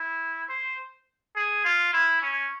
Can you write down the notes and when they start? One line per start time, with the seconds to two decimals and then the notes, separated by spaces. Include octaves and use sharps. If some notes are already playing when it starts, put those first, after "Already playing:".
Already playing: E4
0.49 C5
1.36 G#4
1.65 F4
1.93 E4
2.22 C#4